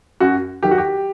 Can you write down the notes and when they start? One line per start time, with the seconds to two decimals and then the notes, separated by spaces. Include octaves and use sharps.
0.20 F#2 F#4
0.63 D#3 F#3 G4
0.71 F#4
0.78 G4